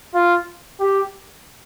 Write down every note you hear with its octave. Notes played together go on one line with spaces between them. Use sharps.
F4
G4